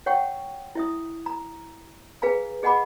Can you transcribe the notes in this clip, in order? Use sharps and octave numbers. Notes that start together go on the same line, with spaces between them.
C#5 F#5 G5 C#6
E4 E5 D#6
A#5
G#4 B4 F5 G#5 A#5
G#4 D#5 F#5 G#5 B5 D6